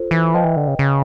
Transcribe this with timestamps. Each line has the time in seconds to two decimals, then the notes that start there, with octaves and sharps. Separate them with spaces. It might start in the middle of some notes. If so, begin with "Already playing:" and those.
Already playing: F4 A4 C5
0.11 E3
0.33 F3 B4 D#5 G5
0.44 E3
0.57 D3
0.68 C#3
0.79 C#3